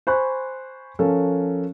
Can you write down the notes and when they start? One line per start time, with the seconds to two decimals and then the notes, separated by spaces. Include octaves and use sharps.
0.07 C5 G#5 B5 C#6 F#6
0.99 F3 C#4 A4 A#4